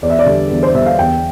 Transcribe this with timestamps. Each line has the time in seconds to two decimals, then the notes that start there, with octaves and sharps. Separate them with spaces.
0.02 E2 D5
0.10 E5
0.19 D5
0.26 D3 G3
0.51 E2
0.63 C5
0.74 D3 G3 E5
0.86 F5
0.99 E2 G5